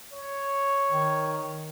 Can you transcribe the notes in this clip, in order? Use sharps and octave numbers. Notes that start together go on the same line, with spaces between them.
C#5
D#3